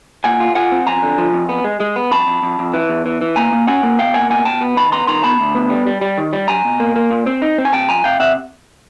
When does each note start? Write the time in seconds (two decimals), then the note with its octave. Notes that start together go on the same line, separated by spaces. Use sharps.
0.24 A#2 F#5 G#5
0.40 F4
0.55 F4 F#5 G#5
0.72 C4
0.87 F2 G#5 A#5
1.02 D3
1.18 F3
1.33 F2
1.49 B3
1.64 G#3
1.80 G#3
1.96 B3
2.11 F2 A5 B5
2.27 F2
2.43 F2
2.59 F2
2.74 E3
2.89 E2
3.06 E3
3.21 E3
3.36 A#3 G#5 A#5
3.52 A#3
3.67 C#4 F#5 G#5
3.83 A#3
3.99 B2 F5 G5
4.14 A#3 F#5 G#5
4.30 B2 F#5 G#5
4.45 B2 G5 A5
4.61 B3
4.77 D#3 A5 B5
4.92 B3 A#5 C6
5.07 D#3 A#5 C6
5.23 B3 A5 B5
5.40 D2
5.55 B3
5.70 G3
5.86 G3
6.01 G3
6.18 D#3
6.33 G3
6.48 F#3 G#5 A#5
6.65 B2
6.80 A#3
6.96 A#3
7.11 A#2
7.26 C4
7.42 D#4
7.58 C4
7.65 G#5
7.73 C3 G5 A5
7.89 F3 G#5 A#5
8.04 C3 F5 G5
8.20 C3 E5 F#5